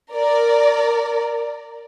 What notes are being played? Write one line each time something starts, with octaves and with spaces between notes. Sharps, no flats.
A#4 D5